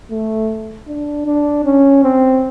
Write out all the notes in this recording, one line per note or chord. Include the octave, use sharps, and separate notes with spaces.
A3
D4
D4
C#4
C4